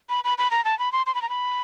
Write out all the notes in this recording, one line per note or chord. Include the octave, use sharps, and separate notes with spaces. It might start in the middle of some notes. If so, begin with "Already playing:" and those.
B5
B5
B5
A#5
A5
B5
C6
C6
B5
A#5
B5